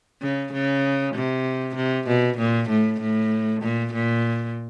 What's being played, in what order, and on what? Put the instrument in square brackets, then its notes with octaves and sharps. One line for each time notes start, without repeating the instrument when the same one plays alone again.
[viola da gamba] C#3
C#3
C3
C3
B2
A#2
A2
A2
A#2
A#2